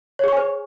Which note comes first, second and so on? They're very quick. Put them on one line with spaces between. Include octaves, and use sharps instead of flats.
C#5 G#4 C#6 G#5 C5